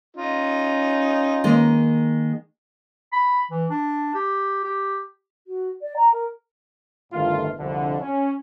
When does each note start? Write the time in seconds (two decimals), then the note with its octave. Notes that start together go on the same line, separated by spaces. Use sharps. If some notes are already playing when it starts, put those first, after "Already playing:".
0.16 C#4 D#4 F4
1.44 D#3 G#3 A#3
3.13 B5
3.51 E3
3.70 D4
4.14 G4
4.64 G4
5.47 F#4
5.81 D5
5.96 A#5
6.12 A#4
7.13 G1 A2 D#3 A3 F4
7.59 C2 F2 D3
8.00 C#4